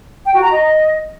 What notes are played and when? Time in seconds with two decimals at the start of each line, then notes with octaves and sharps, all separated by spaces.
0.25 G5
0.34 F#4
0.42 A#5
0.51 D#5